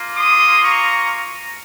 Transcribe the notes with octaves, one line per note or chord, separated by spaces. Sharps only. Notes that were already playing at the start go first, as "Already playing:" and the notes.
Already playing: A#3 F4
C6 D#6
A#5 C#6